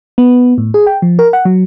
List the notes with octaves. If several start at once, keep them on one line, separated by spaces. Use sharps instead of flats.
B3
A2
G#4
G5
F3
A#4
F#5
F#3